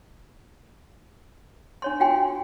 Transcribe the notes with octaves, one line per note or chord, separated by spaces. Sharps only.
D4 C#5 C6
F4 F#4 G5 G#5 C6